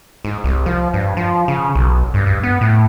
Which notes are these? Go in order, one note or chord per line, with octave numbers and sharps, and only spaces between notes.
G#2
C2
F3
G2
F3
C#3
B1
G2
G2
B3
A2